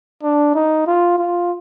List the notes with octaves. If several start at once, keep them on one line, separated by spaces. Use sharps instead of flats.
D4
D#4
F4
F4